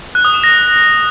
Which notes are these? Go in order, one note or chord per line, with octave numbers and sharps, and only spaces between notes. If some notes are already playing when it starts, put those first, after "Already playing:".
F#6
D#6
E7
A#6